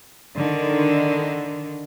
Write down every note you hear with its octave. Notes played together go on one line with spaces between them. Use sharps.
D3 D#3